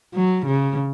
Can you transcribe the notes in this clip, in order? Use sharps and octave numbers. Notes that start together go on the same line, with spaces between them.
F#3
C#3